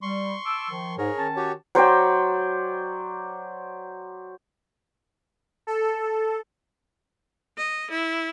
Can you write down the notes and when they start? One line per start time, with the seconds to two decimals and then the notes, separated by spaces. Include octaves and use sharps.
0.02 G3 C6 C#6
0.45 A5 D6 E6
0.70 D#3 F3
0.98 G#2 G#4 A#4 C#5
1.17 D#3 C#4 A5
1.36 F#4 G4 C#5
1.75 F#3 C5 D5 G5
5.67 A4
7.58 D#5
7.90 E4